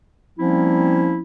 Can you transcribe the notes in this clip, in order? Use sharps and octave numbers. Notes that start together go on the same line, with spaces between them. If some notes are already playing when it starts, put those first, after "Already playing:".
F3 G3 A#3 C4 C#4 E4